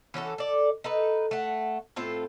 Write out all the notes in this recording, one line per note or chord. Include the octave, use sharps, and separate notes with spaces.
E3 C#4 F#4 A4
A4 D5
D#4 A4 B4
A3 F#5
A2 C4 F4 A4